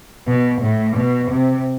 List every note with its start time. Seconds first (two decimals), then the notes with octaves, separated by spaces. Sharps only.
0.27 B2
0.62 A2
0.96 B2
1.31 C3